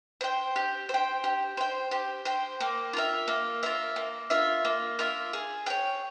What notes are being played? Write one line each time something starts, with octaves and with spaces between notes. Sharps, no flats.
C5 G5
G4
C5
G5
G4
C5 G5
G4
C5 G5
A#3
F4 A#4 E5
A#3
F4 A#4 E5
A#3
F4 A#4 E5
A#3
F4 A#4 E5
G#4
C#5 G5